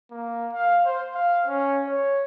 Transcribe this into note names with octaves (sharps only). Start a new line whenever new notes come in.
A#3
F5
C5
F5
C#4
C#5